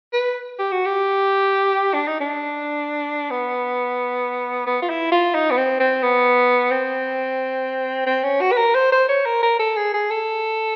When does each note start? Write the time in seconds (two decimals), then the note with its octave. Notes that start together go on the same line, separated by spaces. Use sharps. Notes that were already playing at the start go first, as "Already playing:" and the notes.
0.13 B4
0.59 G4
0.72 F#4
0.85 G4
1.94 D4
2.08 D#4
2.20 D4
3.30 B3
4.67 B3
4.82 F4
4.89 E4
5.12 F4
5.35 D#4
5.51 B3
5.57 C4
5.80 C4
6.02 B3
6.71 C4
8.06 C4
8.23 C#4
8.41 F#4
8.52 B4
8.57 A#4
8.75 C5
8.92 C5
9.09 C#5
9.25 A#4
9.43 A#4
9.59 A4
9.77 G#4
9.94 G#4
10.11 A4